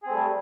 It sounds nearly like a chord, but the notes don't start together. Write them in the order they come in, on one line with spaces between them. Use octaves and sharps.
G#4 C4 A3 G3